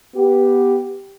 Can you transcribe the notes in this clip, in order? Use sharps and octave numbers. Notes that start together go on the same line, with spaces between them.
B3 G4